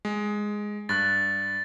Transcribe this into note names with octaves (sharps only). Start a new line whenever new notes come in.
G#3
G2 F#6 A6